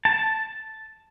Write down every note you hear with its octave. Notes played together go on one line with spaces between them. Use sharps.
A5